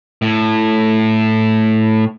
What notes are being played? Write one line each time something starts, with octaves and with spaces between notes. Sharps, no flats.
A2